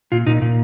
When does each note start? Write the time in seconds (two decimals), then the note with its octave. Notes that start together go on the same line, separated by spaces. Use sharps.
0.12 A#2 F4
0.27 A#2 D#4
0.42 A#2